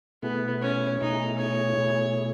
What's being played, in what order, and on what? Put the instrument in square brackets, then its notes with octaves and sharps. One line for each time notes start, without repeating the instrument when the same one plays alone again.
[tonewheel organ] B2 A3 E4 G#4 [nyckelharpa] B3
[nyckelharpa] C#4
[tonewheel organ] B2 A3 E4 G#4 [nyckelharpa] D#4
[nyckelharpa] C#5
[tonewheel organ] B2 A3 E4 G#4